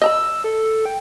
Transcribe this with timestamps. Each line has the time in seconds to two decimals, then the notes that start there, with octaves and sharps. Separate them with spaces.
0.02 D#5 A#5 B5 E6
0.44 A4
0.86 G5